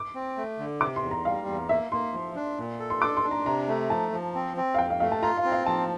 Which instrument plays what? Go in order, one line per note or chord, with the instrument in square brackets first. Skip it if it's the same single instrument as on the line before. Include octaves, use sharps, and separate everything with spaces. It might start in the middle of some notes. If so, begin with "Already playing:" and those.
Already playing: [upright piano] D6
[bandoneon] C4
A3
D3
[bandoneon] C3 [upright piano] D6
[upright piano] C6
[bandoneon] E2
[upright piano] A#5
[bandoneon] G3 [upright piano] F5
[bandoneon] E2
[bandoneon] A#3 [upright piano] E5
[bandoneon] A#3 [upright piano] C6
[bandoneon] F3
D4
A#2
A4
[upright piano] C6
[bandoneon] D4 [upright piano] D6
[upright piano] C6
[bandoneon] D4
[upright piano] A#5
[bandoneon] C3 [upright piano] A#5
[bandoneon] A3
[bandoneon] F3 [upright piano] A5
[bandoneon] F3
C4
C4
[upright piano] F5
[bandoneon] F2 [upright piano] G5
[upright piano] F5
[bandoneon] A3 [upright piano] F5
[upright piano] A5
[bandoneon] F4 [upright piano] A#5
[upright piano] F5
[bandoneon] C4
[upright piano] F5
[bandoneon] F3 [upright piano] A5